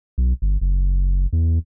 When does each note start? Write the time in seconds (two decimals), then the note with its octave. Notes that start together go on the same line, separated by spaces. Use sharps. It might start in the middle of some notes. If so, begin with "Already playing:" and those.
0.18 B1
0.42 G1
0.61 F#1
1.33 E2